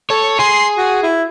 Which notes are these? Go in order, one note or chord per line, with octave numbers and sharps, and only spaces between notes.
A4 C#5
G#4 C6
F#4
E4